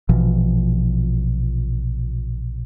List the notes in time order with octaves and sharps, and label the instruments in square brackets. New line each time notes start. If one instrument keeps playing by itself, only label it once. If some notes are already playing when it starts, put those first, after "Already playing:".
[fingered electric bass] A#1 B2 E3 F3